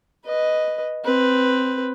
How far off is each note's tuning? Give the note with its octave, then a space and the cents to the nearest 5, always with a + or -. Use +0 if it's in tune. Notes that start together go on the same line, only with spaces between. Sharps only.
B4 +0 D#5 +0
C4 +0 B4 +5